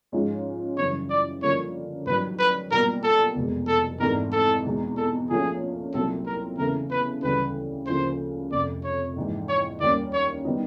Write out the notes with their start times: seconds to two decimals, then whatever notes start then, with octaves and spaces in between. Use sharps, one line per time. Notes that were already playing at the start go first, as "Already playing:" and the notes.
0.12 G#2 F3 G#3 C#4 F4
0.77 F#2 C#3 E3 G3 C#5
1.09 D5
1.42 G2 D3 F3 A#3 C#4 C#5
2.06 A1 G2 D#3 F#3 B4
2.39 B4
2.71 B1 A#2 G3 A#3 A#4
3.03 A4
3.35 F1 E2 B2 G#3
3.68 A4
3.99 G#1 G#2 E3 A3 D4 A#4
4.32 A4
4.64 E2 B2 G#3
4.97 A4
5.29 A#2 F3 A3 C#4 G#4
5.93 C2 A#2 F#3 A3 C4 A4
6.26 A#4
6.58 E2 C#3 E3 A3 A#4
6.91 B4
7.23 D2 C#3 E3 G3 B4
7.86 D2 C#3 F3 A#3 C5
8.51 F1 F2 C3 D5
8.84 C#5
9.16 A#1 G#2 E3
9.49 C#5
9.80 D#2 D#3 G3 A#3 C#4 D5
10.13 C#5
10.45 D#3 G3 B3 D#4